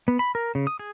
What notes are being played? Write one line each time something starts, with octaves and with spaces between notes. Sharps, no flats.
B3
B5
A#4
C#3
D#6
G#4